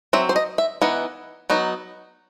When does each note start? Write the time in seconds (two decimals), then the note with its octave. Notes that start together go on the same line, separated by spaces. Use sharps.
0.13 F#3 C4 E5
0.29 C5
0.36 D#5
0.58 E5
0.82 E3 B3 D#4 F#5
1.50 F#3 B3 D#4